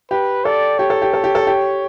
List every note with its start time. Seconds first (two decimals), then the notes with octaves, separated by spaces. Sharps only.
0.10 G4 B4
0.45 A4 D5
0.79 G4 C#5
0.90 A4
1.02 G4
1.14 A4
1.24 G4
1.35 A4
1.47 G4